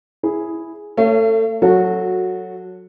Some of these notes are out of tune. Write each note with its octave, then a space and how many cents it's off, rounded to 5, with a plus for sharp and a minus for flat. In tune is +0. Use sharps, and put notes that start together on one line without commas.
E4 +0 G#4 +0
A3 +25 C#5 +0 F5 -45
F#3 -5 F#4 -15 A4 +10